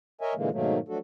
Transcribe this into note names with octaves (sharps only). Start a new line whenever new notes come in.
A#4 C#5 D#5 E5 G#5
A#2 D3 E3 G#3 A#3
G#2 B2 D#3 F#3 A3 A#3
F3 F#3 A3 D4 F#4 A4